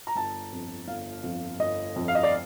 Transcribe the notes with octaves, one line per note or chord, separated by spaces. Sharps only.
A#5
G1 A5
F2
G1 F5
F2
G1 D#5
F2
F5
D#5
D5